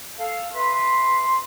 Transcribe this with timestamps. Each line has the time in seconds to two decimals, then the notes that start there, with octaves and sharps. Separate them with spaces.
0.17 A4 F5
0.52 B4 E5 C6